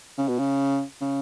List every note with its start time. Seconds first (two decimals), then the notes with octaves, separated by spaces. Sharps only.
0.18 C#3
0.28 B2
0.39 C#3
1.01 C#3